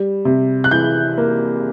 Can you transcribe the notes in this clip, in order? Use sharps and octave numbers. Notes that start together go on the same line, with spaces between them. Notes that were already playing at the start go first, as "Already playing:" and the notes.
Already playing: G3
C3
F#6
E3 G6
A#3